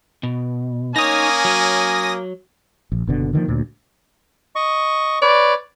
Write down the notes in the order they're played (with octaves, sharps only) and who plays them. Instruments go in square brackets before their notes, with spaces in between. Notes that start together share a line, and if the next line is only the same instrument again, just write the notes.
[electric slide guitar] B2
[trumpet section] A#3 C#4 G#5 [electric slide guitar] D#4 C#5 [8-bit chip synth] D#6 A#6
[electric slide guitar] F#3
[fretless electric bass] A#1
F#1 B2 D3
D3 D#3 F3 A#3
D2 A#2
[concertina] D#5 C#6
[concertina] B4 C#5 [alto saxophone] D5